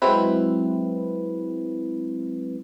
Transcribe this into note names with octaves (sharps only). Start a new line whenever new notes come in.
F#3 G#3 C4 E4 B4